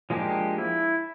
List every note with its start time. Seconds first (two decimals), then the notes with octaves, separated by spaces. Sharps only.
0.10 F3 G#3 A#3 D4 G4
0.58 E4